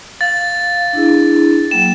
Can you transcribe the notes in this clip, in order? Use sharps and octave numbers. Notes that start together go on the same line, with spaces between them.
F5 A6
D4 E4 G#4
F#3 A#3 G5 E7